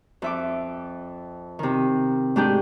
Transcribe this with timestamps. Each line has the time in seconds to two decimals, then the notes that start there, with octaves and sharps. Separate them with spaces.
0.22 F2 E5 D6
1.59 C3 D#3
2.36 G#2 A3 D4 G4 G#4 G6